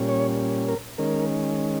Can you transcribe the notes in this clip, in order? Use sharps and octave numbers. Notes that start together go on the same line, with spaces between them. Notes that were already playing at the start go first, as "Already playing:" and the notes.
Already playing: A#2 G3 C#4
C#5
A#4
D#3 G#3 C#4 A#4